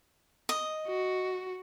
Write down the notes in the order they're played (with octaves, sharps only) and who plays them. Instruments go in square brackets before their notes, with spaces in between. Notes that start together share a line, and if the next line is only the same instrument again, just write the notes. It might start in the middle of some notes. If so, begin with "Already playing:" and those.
[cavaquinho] D#5
[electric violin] F#4